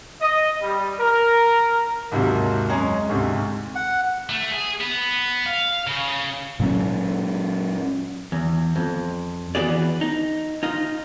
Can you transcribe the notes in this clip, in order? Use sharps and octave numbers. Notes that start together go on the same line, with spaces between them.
D#5
G3
A#4
D#2 G#2 C3 D#3 F#3
F#2 G#3 C#4 A#5
D2 G#2 C3
F#5
A3
G#4
B3
F5
C#3
A#2 F#3 C#4
E2
F2
E3 B3 F#4 G#4 D5
D#4
D#4 F4